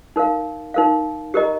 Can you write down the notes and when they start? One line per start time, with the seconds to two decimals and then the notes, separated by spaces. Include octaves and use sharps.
0.16 D#4 A#4 F5
0.74 D#4 A#4 F5
1.34 G4 A#4 D#5 A#5